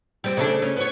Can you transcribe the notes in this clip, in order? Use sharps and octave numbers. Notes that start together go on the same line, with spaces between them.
G3 C4
C#3 A3 D4
C#4
B3 C#5